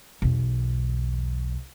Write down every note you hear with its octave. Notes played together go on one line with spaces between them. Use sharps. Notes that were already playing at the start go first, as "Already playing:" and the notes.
B1 E2